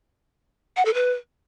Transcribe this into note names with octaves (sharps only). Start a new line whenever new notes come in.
F#5
A4
B4